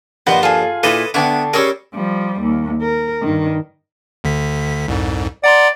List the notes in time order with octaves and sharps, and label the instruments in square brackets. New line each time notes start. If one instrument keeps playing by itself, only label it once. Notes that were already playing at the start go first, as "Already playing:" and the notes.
[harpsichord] G2 A#2 F3 [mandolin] B4 C5 [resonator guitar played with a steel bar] D#5 F#5
[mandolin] F4 G#4 [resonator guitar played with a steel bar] A4
[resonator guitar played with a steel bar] A#2 E4 [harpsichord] A4 B4 D#5
[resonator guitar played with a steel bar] D3 D4 G5 [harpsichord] B3 E4 [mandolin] C#6
[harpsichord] G3 C#4 A#4 [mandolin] G#4 C#6 E6
[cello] F3 G3
D#2
A#4
G2 D#3
[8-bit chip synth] D2 D3 B6
C2 F2 G#2
[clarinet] D5 [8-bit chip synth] F#5 A#5 C6